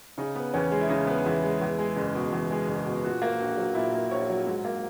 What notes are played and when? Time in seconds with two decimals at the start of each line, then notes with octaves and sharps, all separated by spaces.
0.18 C#3 D#4
0.36 B3
0.54 E2 C#4
0.72 G#3
0.81 E4
0.90 C#3 D#4
1.07 B3
1.25 E2 E4
1.43 G#3
1.61 E2
1.79 G#3
1.97 F#1
2.15 B2
2.32 E2
2.51 G#3
2.68 F#1
2.86 B2
3.04 A#2 F#4
3.22 A#3
3.40 A#1 F#4
3.57 F#3
3.75 A#2 E4
3.93 A#3
4.11 A#1 C#5
4.29 F#3
4.47 G#2
4.65 A#3